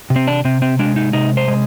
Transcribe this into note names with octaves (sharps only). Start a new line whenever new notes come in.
C3
C4
D4
C3 C4
C4
G#3 D4
D#4
C3 D#4
C5
G#3